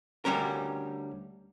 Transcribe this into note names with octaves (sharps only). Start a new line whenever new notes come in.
D2 G3 C#4 A#4